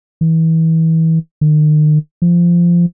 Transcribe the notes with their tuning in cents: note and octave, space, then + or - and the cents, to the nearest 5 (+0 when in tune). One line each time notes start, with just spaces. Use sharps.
E3 -30
D#3 -40
F3 -15